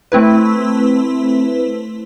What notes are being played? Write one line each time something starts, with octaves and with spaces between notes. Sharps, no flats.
A3 C4 E4 B4